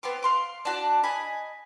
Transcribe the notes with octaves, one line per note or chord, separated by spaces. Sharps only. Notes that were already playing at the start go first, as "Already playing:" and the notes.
B3 C4 C6 D6
F5 C6 D6
D4 F#4 D5
D#5 G#5 B5